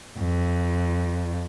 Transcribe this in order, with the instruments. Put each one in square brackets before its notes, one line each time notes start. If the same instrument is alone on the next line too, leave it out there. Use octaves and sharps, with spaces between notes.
[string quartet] F2